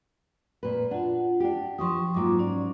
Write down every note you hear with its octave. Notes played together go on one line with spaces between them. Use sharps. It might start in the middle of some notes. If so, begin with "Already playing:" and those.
A#2 B4
D4 F4 F#5
D4 G4
F3 F4 G4 C6 C#6 D#6
G#2 F#3 A#3 F4 D6
C#4 D5